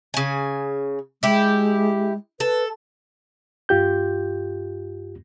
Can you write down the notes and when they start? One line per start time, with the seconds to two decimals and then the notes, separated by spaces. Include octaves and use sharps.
0.14 C#3 G#5
1.23 G#3 E4 G4
2.40 A4 B4
3.69 G2 F4 G4 G6